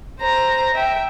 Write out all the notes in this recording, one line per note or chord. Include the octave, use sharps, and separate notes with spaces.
C5 A#5
E5 G5